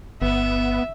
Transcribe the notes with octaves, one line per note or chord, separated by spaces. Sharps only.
G1 B3 E5